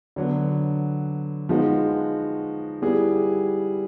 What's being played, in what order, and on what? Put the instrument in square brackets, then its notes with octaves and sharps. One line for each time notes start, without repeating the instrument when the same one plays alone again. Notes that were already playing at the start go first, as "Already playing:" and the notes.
[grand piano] D3 F#3 B3
F3 G#3 B3 D#4 F#4
G3 B3 E4 G#4